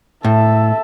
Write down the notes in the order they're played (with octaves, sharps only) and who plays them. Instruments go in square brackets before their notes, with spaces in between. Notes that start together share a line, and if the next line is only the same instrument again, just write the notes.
[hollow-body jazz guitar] A2 [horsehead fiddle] A4 E5